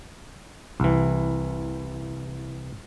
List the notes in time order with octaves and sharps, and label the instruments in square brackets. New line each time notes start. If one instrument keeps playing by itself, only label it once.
[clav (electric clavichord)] C2 E3